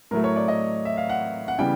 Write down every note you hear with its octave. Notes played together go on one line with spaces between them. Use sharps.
A2 F#3 A3 A#4
C#5
D5
D#5
E5
F5
F#5
F#5
C#3 E3 G3 B3 G5